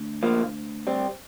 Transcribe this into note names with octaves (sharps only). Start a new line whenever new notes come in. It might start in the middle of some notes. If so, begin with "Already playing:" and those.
Already playing: D2 D3
F3 A#3
G3 C4